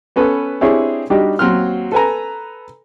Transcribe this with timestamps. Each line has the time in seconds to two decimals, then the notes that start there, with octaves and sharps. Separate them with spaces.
0.16 B3 C#4 A4 B4
0.61 C4 D4 E4 G4 G#4 C#5
1.10 G3 D4 D#4 F#4 G4
1.39 D#2 F#3 C4 C6 F6
1.92 A4 B4 G#5 A#5